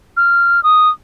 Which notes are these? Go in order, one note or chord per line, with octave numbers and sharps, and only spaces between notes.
F6
D#6